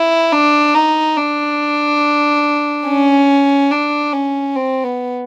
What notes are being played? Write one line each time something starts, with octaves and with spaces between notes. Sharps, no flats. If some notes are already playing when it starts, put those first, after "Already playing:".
Already playing: E4
D4
D#4
D4
C#4
D4
C#4
C4
B3